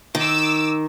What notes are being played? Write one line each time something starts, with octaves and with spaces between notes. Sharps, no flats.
D#3 D6 E6